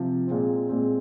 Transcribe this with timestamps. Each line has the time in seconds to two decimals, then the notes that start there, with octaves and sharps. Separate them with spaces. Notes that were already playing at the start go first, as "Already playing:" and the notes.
Already playing: C3 F3
0.27 A#2 G#3 C4
0.69 A#2 G#3 C4